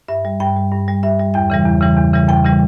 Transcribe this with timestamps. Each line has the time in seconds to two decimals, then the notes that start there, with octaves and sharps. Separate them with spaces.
0.08 G2 E5
0.25 G3
0.40 G2 G5
0.56 G3
0.72 G2
0.88 G3
1.03 G2 E5
1.19 G3
1.34 E2 G5
1.50 C#3 E3 G3
1.66 E2
1.81 C#3 E3 G3
1.97 E2
2.13 C#3 E3 G3
2.29 E2 G5
2.45 C#3 E3 G3